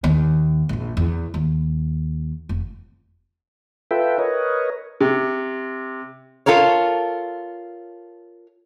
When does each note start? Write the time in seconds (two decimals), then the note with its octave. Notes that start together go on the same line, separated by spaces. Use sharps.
0.04 D#2
0.69 A#1 F2
0.97 E2
1.34 D#2
2.49 F1
3.91 F4 A4 B4 E5 G5
4.19 A#4 B4 C#5 D#5
5.01 C3
6.46 F4 A4 A#4 C#5